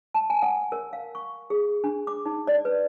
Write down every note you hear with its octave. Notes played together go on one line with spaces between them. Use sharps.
A5
G#5
F#5
A#4
F5
C#6
G#4
D4
D6
D#4
D5
B4